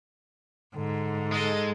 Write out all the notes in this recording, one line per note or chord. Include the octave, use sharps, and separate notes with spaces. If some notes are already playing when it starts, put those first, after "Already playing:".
G#2 D3
G#3 A4 D#5